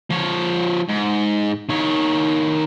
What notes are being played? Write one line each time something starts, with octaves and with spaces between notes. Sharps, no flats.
F3 C#5
G#2
D#3 C#5